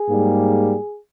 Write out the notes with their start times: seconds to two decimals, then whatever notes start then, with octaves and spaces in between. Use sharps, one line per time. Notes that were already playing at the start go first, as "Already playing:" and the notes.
Already playing: G#4
0.09 G#2 G3 A#3